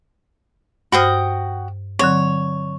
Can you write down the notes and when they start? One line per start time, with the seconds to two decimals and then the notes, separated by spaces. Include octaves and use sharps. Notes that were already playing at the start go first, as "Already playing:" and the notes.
0.92 G2 F#4 C5 G5 D#6 F6
1.99 D3 F#3 C4 C#5